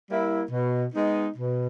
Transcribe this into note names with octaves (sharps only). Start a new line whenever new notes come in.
G3 A#3 E4
B2
G#3 B3 D#4
B2